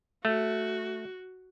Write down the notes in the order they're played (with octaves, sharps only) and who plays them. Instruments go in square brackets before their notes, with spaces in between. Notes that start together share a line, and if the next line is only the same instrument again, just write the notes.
[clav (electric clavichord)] A3 [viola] F#4